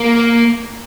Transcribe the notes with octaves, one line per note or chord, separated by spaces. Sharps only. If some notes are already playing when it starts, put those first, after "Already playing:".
Already playing: A#3